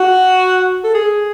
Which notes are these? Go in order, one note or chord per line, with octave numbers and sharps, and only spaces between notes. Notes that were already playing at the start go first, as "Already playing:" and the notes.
Already playing: F#4
A4
G#4